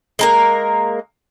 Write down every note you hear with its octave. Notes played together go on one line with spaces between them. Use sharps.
G#3 A#3 A#4